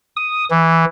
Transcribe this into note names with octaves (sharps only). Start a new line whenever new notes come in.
D#6
E3